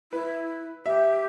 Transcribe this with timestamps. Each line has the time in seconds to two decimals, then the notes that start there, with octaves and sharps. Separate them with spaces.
0.12 E4 B4
0.86 G4 E5